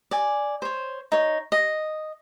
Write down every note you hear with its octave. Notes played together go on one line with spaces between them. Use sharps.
D5 G#5
C5 C#5
D#4 C#5
D#5